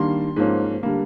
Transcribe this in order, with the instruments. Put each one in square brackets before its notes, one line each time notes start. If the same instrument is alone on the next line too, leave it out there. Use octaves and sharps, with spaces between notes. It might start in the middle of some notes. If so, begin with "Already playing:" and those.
Already playing: [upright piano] D#3 G3 A#3 D4 C6
G#2 F3 A#3 C#4
D3 G3 A#3